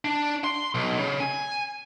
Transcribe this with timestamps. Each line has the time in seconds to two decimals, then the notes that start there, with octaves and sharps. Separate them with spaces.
0.05 D4
0.44 C6
0.75 B1
0.99 C#3
1.20 G#5